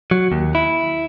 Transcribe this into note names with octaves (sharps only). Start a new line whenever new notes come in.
F#3
D#2
E4